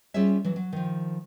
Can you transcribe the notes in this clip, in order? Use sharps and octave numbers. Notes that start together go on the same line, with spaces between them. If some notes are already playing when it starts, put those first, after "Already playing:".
G3 C#4 F4 G#4 C#5 E5
E3 F#3 F#4
F#3
D#3 F3